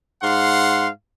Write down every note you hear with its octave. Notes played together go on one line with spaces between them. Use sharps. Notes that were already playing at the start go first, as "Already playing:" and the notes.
G#2 F5 F#5 C6